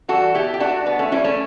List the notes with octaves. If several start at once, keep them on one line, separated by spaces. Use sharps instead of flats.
E3 G3 F#4 A4
B2 E4 G4
G4
A3 D4 F#4
B2 B3
A3 C#4
G3 C#4 E4
A3 C#4